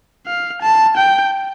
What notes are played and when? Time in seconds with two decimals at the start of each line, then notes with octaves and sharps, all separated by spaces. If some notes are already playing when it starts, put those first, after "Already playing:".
0.27 F5
0.62 A5
0.97 G5